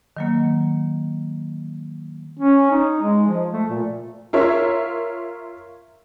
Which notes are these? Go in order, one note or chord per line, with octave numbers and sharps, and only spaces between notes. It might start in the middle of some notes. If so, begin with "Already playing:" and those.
D#3 F#3 A#3
C#4
D#4
G#3
F3
A3
A#2
F4 A#4 C#5 E5